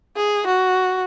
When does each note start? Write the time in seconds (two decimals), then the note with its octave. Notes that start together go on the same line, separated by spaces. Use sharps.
0.16 G#4
0.47 F#4